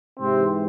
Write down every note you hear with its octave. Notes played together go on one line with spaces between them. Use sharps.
G#2 C3 E3 C4